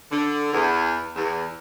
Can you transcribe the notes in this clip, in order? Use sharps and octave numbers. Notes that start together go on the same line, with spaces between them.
D3
E2
E2